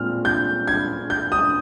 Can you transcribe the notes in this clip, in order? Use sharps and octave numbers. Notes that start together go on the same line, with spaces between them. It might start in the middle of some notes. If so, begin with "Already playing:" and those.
Already playing: A#2 G#3 C4 F6
G6
G#6
G6
D#6